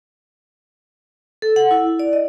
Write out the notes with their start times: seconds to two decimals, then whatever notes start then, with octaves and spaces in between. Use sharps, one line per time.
1.42 A4
1.56 F#5
1.71 E4
1.99 D5
2.13 D#5